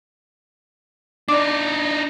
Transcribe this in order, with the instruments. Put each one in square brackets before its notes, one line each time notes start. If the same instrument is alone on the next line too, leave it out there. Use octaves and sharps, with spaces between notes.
[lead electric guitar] D4 D#4 [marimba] D5 D6